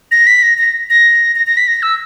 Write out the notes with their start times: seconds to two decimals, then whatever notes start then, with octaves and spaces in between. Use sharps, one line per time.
0.11 A#6
0.27 B6
0.43 A#6
0.58 A#6
0.90 A#6
1.36 A#6
1.47 A#6
1.57 B6
1.67 A#6
1.83 E6